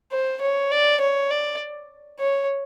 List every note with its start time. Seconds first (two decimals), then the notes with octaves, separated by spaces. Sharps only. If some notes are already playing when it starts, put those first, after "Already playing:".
0.12 C5
0.41 C#5
0.71 D5
1.01 C#5
1.31 D5
2.19 C#5